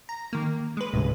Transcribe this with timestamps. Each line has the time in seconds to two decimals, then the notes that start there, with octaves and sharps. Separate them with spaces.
0.09 A#5
0.33 D#3 A#3
0.77 G#3 B4
0.94 D1 A2 C#3